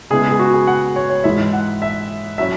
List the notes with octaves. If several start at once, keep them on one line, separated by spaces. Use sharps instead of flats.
C#3 G#3 B3 E4 G#4
G#4
F#4
G#4
F#5
C#5
C#5
G#2 E3 G#3 E4 E5
F#5
E5
F#3 C#4 E4 E5